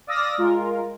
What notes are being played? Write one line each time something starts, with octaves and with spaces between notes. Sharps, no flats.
D5 F5 D#6 E6 A#6
G#3 F4 A#4